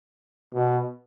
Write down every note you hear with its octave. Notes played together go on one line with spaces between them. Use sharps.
B2